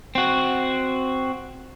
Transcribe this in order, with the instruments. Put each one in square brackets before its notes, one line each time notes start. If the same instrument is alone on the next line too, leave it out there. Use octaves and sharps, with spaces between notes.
[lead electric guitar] C4 F#4